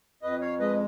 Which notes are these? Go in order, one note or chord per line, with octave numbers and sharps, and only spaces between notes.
F2 B4 D#5
C#5 F5
G#3 B4 D#5